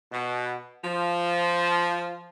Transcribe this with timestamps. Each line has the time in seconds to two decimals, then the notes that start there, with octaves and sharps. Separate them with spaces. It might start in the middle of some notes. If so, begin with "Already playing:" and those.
0.12 B2
0.84 F3